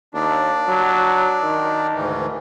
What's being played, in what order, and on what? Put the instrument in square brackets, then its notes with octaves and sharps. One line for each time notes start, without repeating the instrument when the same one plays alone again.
[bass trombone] D#2 [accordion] D4
[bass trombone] F#3
D#3
[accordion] D2 G#2 E3